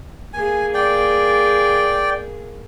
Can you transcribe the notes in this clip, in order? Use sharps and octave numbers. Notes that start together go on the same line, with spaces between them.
A#3 G#4 G#5
D5 G5